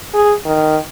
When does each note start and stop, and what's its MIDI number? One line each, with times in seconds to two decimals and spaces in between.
0.14 0.34 68
0.45 0.77 51